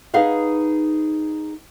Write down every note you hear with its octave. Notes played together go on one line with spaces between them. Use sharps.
D#4 G#4 B4 F5 F#5